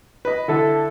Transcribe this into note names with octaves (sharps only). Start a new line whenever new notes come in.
B4 D#5
D3 E4 A4